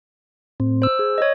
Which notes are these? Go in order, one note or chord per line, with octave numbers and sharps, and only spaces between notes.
A2 C4
C5 E6
G#4
C#5 D#5